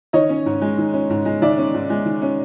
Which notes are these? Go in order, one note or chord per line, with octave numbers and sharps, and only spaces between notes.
D#3 C#5 D#5
C#4
G#2
G#3
D#3
C#4
G#2
G#3
D#3 D5 E5
C#4
G#2
G#3
D#3
C#4